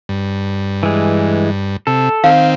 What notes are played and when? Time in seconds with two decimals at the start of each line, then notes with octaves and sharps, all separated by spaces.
0.09 G2
0.83 E3 G#3
1.87 C3 A4
2.24 D#3 C4 F5